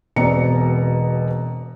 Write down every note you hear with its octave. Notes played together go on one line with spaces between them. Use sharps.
E1 B2 C4 D5 A#5 C#7